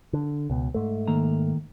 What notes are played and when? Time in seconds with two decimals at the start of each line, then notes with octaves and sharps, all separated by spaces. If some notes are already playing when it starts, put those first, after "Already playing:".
0.13 D3
0.50 C#2 B2
0.74 G#2 A3
1.08 D#3 A#3 A#5